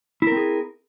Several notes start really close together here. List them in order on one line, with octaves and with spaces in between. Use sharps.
E4 A#4 C4 G#4